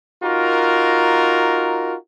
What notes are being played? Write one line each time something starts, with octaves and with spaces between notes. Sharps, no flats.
D#4 F4 F#4 A#4